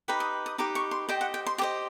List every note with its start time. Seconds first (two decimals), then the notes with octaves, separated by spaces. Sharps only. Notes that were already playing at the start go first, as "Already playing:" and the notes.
0.08 D#4 G4 B4 B5
0.20 D#6
0.46 D#6
0.58 D#4 G4 B4 D6
0.75 C#6
0.91 C6
1.09 G4 C5 D#5 G5
1.21 F#5
1.34 G5
1.46 C6
1.58 G4 C5 D#5 D6